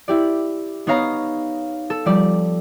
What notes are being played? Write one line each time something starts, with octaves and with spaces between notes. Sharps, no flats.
E4 G4 D5
B3 D#4 C#5 F5 A#5
A4
F3 G3 D5